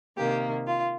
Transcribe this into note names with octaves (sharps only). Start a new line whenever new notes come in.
C3 D#3 A#3 G4
F4